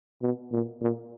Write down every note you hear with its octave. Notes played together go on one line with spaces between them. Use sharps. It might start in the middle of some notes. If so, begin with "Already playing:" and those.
B2
A#2
A#2